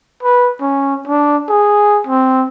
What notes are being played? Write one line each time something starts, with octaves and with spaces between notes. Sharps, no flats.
B4
C#4
D4
G#4
C4